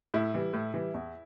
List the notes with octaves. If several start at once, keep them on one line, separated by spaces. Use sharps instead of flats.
A2 E4
E3 G3
A2
E3 G3
E2